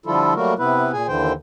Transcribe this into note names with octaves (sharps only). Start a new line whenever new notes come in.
D3 F3 G3 E4 F4 A4
F#3 G3 A3 A#3 F#4 A#4
C3 B3 E4 B4
A#2 G#4 G#5
D#2 D3 E3 C5 G5